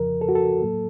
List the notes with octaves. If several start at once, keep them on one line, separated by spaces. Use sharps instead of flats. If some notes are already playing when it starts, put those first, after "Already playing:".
Already playing: F2 C#3 F3 A#4
A4
F#4
A4
A2 F#3 A#3